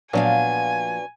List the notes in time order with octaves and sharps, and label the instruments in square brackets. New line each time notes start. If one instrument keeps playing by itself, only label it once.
[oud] A#2 F3 F5 [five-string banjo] F#3 B3 D4 [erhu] G#5